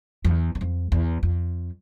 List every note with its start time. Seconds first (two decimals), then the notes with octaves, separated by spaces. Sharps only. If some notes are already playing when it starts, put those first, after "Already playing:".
0.24 F2
0.30 E2
0.55 E2
0.61 F2
0.92 E2
1.23 F2